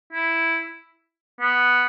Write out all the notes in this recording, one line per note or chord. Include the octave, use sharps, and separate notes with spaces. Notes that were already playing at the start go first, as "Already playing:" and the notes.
E4
B3